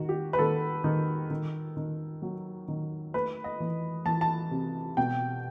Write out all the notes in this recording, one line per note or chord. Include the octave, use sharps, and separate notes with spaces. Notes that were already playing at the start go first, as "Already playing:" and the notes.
Already playing: D#3 F#4
G4
B4
D#3 A4
D#3
D#3
D#3
F#3
D#3
A3 B4
D#5
E3
E3 A5
A5
C3
B2 G5